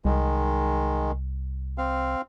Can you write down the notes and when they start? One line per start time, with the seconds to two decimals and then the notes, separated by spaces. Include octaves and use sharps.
0.05 C2 D#3 G#3
1.78 C4 F5